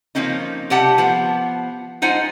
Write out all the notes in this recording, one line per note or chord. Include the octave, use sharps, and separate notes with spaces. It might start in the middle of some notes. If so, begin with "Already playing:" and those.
F3 A#3 C4 C#4 D#4
C3 G3 G4 F#5 A5
F3 B3 F#5
G#3 D#4 F4 C5 F#5 G#5